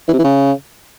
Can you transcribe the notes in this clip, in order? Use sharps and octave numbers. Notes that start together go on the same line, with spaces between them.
E3
C3
E3
C#3